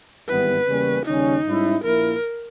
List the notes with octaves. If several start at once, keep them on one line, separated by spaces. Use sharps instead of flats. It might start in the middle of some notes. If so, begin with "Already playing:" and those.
G#1 G2 E3 G3 B3 B4
E2 C#3 G3 A#3 C#4
D#2 C#3 G3 C#4 D#4
G#2 G3 C#4 E4
A#1 A#2 A#3 E4 A#4